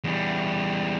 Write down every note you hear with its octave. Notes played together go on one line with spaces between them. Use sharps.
E2 G3